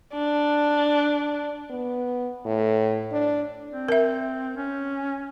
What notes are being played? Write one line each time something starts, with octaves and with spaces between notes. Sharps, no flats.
D4
B3
A2
D4
C4
A#4 E5
C#4